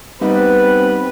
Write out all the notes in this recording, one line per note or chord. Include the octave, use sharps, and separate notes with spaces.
G3 B3 C4 D#4 B4